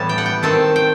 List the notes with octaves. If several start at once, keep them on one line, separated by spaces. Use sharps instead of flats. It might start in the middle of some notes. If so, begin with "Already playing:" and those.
Already playing: A2 E3 G3 B3 A5
G5
F#5
G5
D#3 A3 C4 A5
G5